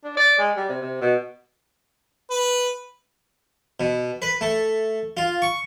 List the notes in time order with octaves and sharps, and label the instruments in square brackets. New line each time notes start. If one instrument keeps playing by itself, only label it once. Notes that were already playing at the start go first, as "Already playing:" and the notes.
[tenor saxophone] D4
D5
G#3
G3
C3
C3
B2
[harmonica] B4
[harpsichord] B2
B4
A3
F4
C#6